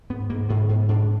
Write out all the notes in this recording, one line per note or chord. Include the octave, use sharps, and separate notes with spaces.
G#2 B3
G#2 A#3
G#2 B3
G#2
G#2 D4